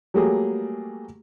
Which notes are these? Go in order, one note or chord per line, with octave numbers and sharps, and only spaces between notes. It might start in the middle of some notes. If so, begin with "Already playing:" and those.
F#3 G3 A3 A#3 G4 G#4